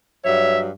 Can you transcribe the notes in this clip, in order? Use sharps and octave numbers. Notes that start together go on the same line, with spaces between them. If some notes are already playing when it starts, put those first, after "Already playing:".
G2 F#3 C#5 E5